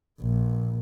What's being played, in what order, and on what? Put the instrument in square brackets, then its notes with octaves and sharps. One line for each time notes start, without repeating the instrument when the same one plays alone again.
[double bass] A#1